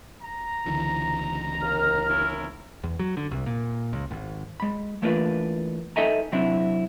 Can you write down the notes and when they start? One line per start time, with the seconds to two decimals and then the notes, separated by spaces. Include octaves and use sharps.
0.21 A#5
0.65 C#2 D3 E3
1.62 D#2 F6
2.08 C#4 E4 A#4
2.84 E2
2.99 F#3
3.17 D3
3.31 C2
3.46 A#2
3.93 C#2
4.11 G#1
4.60 G#3 B5
5.02 E3 A3 A#3 D4 F4 B4
5.96 D#4 A4 D#5 E5 G#5 A#5
6.32 C3 F#3 C4 D4 E4